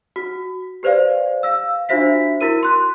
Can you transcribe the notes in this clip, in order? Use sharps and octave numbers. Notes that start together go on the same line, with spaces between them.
F#4
G4 B4 C5 D5 F5
F5 E6
D4 F4 F#4 C5 E5 B6
E4 F#4 A#4 D#7
C6 F#6